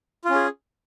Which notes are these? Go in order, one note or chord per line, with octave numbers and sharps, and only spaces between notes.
C#4 F4 G#4